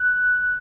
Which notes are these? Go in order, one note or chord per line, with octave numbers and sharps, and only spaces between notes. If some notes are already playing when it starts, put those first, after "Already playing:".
Already playing: F#6